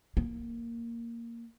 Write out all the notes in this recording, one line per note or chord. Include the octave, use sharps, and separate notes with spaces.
A#3